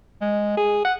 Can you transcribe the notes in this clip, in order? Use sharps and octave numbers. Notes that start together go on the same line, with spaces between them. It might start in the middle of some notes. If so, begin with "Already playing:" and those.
G#3
G#4
F#5